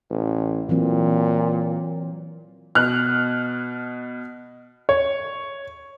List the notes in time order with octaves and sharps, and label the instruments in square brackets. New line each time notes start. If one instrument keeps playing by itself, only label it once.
[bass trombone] A1
[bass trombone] A#2 [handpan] E3 F#3 C4
[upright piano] B2 F6 F#6
[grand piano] C#5